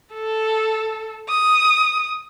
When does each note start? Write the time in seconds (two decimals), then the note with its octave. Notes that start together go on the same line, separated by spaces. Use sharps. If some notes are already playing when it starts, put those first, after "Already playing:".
0.14 A4
1.29 D#6